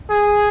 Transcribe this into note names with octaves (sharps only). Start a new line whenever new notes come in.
G#4